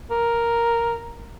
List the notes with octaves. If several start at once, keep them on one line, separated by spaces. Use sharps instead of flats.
A#4